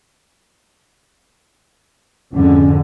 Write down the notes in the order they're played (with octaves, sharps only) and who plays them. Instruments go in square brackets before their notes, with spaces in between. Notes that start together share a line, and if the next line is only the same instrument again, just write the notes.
[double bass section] F2 G#2 D3 [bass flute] C#4